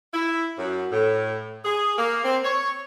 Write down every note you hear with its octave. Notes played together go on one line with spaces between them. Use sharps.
E4
F#2
A2
G#4
A#3
C4
C#5